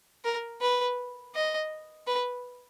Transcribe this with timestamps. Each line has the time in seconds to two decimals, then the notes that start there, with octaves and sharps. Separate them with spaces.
0.24 A#4
0.61 B4
1.35 D#5
2.07 B4